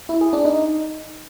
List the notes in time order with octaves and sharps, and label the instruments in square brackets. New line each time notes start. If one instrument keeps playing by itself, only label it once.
[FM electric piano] E4
G#4
D4
D#4